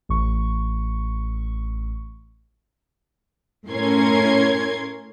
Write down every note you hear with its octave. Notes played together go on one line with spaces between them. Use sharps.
A1 C#6
A2 C#4 A#4 C6 G#6